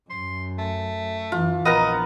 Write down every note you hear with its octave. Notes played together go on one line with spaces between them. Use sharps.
F#2 C6
A3
F#2 E3 F4
A#1 B3 A#4 D#5 A#5